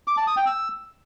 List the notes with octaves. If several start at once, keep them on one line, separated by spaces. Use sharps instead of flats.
D6
A5
D#6
G5
E6